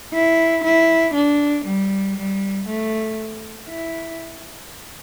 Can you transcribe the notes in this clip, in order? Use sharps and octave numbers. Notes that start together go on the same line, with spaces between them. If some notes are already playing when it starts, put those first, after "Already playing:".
E4
E4
D4
G3
G3
A3
E4